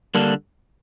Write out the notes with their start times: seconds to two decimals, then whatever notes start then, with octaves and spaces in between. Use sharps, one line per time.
0.15 D3 G3 A#3 D4